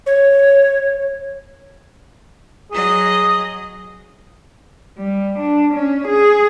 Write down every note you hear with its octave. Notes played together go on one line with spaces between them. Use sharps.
C#5
F#3 G#4 D#5
G3
D4
C#4
G#4